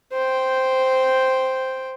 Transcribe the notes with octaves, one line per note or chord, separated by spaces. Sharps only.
C5 G5